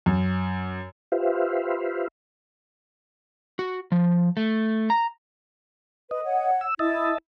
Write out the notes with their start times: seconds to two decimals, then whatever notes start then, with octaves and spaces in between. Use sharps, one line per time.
0.06 F#2
1.12 F4 G4 B4 C5 E5 F5
3.59 F#4
3.92 F3
4.37 A3
4.90 A#5
6.11 B4 D#5
6.24 C#5 F#5
6.61 E6
6.79 E4 D#5 E5 A5